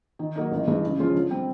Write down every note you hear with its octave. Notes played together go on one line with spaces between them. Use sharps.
D#3
F#3 A#3 D#4
A1
G2 E3 G#3
C#3
F3 G#3 C#4 F4
D3
G3 C4